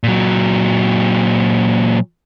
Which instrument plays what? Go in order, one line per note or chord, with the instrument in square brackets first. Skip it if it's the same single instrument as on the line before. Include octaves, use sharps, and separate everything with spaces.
[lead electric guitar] A#2 F#3